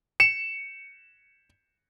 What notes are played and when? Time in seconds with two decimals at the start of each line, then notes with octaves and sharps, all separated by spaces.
0.20 C#7 E7